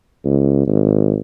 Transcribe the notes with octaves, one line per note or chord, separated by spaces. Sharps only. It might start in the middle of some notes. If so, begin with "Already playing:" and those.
C#2
G#1